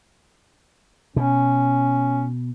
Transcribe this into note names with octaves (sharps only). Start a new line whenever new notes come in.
B2 C#4